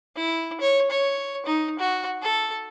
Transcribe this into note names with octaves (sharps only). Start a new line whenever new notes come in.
E4
C#5
C#5
D#4
F#4
A4